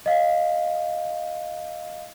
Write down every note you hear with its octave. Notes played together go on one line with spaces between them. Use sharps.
D#5 F5